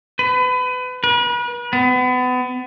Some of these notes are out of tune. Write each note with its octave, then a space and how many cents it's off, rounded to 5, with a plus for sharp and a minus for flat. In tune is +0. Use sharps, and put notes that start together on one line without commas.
B4 +30
B4 -40
B3 +30